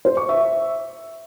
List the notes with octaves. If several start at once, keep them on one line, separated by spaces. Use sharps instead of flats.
C5
C#6
E5